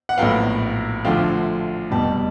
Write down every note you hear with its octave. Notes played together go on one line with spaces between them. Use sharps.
F#5
A#1 A2 F#3 B3 F5 G5
D2 D3 F3 A3 F5 G5
F1 E2 B2 G3 G5 A5